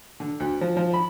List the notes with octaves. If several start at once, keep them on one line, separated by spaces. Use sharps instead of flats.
D3
D2
F3
F3
B5